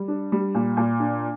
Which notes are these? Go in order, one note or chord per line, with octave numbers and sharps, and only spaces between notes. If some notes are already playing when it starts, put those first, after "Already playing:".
Already playing: G3
D4
G3
A#2
A#2
D4